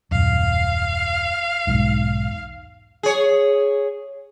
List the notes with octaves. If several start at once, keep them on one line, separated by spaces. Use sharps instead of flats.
D#1 F#2 F5
B1 E2 G#2
G#4 C#5